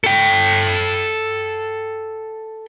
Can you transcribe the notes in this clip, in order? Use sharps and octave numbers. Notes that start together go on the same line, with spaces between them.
A4 G5